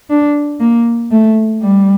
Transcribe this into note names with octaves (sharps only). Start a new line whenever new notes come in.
D4
A#3
A3
G3